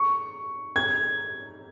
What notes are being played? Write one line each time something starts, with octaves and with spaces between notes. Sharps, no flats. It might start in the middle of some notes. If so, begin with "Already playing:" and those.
Already playing: C#6
G#6